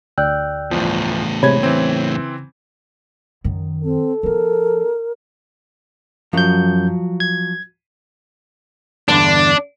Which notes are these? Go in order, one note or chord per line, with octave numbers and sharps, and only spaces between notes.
D2 D5 G5 E6 F#6 G6
G1 E2 A2 F3
C3 G#3 C#5 B5 G#6
C#3 E3 C4
F#2 D#3
C4 A4
F3 B3 A#4
F#2 F3 F#3 G6
G#6
E2 G2 D3 D4